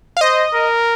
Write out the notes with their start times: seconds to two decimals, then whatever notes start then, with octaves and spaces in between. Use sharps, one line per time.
0.17 F5
0.21 C5 D#5
0.54 A#4